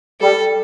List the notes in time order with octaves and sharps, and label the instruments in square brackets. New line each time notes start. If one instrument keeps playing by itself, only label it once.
[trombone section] G3 [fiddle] A4